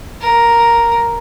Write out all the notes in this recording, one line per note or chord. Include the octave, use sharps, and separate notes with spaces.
A#4